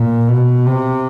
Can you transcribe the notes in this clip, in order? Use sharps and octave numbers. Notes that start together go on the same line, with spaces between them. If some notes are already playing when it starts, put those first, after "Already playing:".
Already playing: A#2
B2
C3